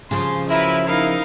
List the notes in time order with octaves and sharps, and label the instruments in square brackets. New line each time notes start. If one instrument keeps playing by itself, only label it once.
[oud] C#3 F3 [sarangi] C6
[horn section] F#3 E4 [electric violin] A#4 B4 [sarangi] E5
[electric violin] D#4 F5 [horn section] E4 [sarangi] A#4